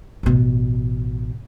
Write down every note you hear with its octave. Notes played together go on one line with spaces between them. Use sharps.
A1 B2